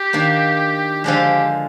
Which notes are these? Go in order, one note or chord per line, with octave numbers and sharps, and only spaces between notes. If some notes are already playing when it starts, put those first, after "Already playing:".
Already playing: G4
D#3 A#3 D4
D3 F3 G#3 D4 F4 G4